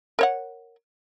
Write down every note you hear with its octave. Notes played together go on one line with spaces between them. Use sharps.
A#4 C#5 F#5